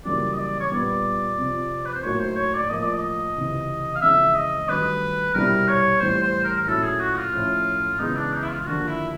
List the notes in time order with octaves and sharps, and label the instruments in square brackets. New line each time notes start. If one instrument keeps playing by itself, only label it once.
[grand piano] F#2 C#3 E3 G3 A#3 [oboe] D5
[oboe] D#5
D5
C#5
[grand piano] A#2 G3 B3 [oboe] D5
[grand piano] F2 C3 F3
[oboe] B4
C5
[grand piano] A2 F#3 A#3 D#4 [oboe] C#5
[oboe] C5
C#5
D5
[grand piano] A2 F3 A#3 [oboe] D#5
[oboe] D5
D#5
[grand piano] C#2 C3 E3
[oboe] F5
[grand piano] F2 C#3 E3 G#3 [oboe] E5
[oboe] D#5
[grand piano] G2 D#3 F#3 A3 [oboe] B4
[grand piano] C2 B2 G3 C4 E4 [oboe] A#4
[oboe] C#5
[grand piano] A2 E3 G3 [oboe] C5
[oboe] C5
A#4
A#4
[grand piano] A#2 F#3 A3 C#4 E4 [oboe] A4
[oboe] G#4
F#4
F4
[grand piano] A2 F3 A3 C#4 E4
[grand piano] C#3 E3 G#3 B3 [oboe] D#4
[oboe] D4
D#4
E4
F4
F4
[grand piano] D#2 D3 F3 A#3 D4 [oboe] F#4
[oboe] E4